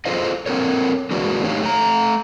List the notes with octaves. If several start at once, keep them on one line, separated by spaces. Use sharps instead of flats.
F4 G#4 A4 C5 D#5 F5
C4 A4 A#4 C#5
D3 E3 G#3 A#3 D4 F#4
A3 D#4 G4 C#5 F5
A3 A#5